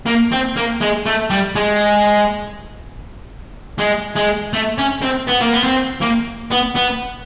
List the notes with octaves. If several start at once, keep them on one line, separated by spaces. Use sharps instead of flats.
A#3
C4
A#3
G#3
A3
G3
G#3
G#3
G#3
A3
C#4
C4
B3
A#3
B3
C4
A#3
B3
B3